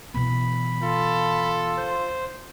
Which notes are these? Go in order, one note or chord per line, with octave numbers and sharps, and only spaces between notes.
B2 E3 B5
F4 A4
C5